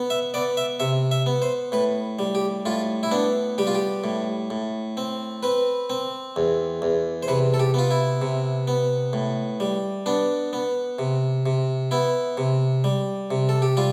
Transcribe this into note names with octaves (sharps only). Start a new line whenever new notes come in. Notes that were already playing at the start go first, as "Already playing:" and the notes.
Already playing: B3
E5
B3 D5
E5
C3 E5
E5
B3
C5
A2 B4
G3
G4
A2 F4
E4
B3 D4
G3 G4
F4
G4
A2
A2
C4
C4 B4
C4
E2
E2
C5
C3 B4
A4
G4
B3 F4
E4
C3
B3
A2
G3
B3 D4
B3
C3
C3
B3 E4
C3
G3
C3
A4
G4
G3 F4